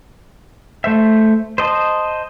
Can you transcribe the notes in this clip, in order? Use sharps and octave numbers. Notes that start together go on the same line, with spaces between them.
A3 C5 E5
C5 D#5 A5